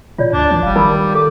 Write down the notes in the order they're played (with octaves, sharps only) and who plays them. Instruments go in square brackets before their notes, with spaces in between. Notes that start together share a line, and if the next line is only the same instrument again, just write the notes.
[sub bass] A#2 [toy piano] F4 C#5 D5
[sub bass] D2 [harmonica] D4
[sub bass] E3
[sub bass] F1 [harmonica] G3 [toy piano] F5
[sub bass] D#3 [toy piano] D#4 A#4 B5
[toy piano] A4 [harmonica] D6